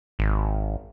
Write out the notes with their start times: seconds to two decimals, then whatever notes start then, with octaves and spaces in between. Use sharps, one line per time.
0.19 G#1